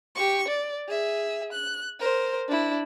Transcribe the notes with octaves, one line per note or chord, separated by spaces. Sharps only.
G4 C#6
D5
G#4 E5
F#6
A#4 C5
D4 E4